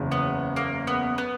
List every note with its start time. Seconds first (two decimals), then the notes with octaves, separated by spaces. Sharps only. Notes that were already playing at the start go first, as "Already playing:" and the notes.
Already playing: F#1 E2 C#3
0.12 B3
0.56 A#3
0.87 B3
1.18 B3